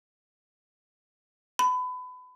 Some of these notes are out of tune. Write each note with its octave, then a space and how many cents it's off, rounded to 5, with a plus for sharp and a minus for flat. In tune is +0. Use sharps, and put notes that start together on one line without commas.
B5 +30